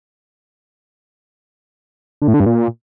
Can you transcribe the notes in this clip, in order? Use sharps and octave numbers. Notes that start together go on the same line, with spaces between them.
D3
A2
D3
G2
A#2